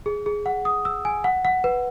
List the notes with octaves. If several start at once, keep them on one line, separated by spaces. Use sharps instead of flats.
G#4
G#4
F#5
D#6
E6
G#5
F#5
F#5
B4